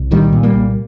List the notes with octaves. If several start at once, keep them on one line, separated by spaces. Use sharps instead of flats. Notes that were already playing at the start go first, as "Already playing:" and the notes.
Already playing: C2
A#2 D#3 G3
A#2
G3 A#3
C2